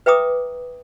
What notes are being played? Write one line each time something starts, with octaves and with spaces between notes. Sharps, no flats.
B4 E5 G5 A#5 D6 D#6